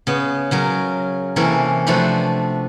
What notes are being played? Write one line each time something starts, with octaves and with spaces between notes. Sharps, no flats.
C#3 B3
C#3 F#3 A#4
C3 E3 A#3 C#4 A4 A#4
C3 F3 A3 D4 F#4 B4